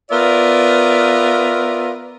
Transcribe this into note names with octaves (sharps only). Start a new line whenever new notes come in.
B3 F4 A#4 D5 E5